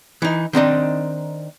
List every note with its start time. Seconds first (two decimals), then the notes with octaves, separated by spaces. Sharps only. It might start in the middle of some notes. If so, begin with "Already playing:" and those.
0.22 E3 D#4
0.53 D#3 C4 D4 D#4